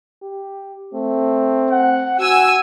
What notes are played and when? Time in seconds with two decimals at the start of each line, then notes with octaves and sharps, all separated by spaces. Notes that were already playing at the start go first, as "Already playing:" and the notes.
0.22 G4
0.94 A3 C4
1.71 F#5
2.19 F#4 F#5 G#5 E6